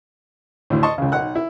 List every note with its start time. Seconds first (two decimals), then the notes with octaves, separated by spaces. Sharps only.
0.70 D2 A2
0.83 D#5 A5 C6 C#6
0.98 C#2 C#3
1.12 B1 D#4 F#5 F#6
1.35 E4